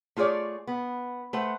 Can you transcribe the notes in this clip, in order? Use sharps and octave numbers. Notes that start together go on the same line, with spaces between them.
A3 F4 G#4 C#5 D5
B3
A3 B4 C5 F#5